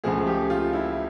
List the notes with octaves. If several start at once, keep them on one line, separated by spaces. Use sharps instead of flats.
C#2 C#3 F3 A3 G#4
G4
F4
E4